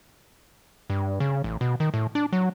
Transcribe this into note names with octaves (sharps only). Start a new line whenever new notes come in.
G2
C#3
A1
B2
D#3
A2
D4
F#3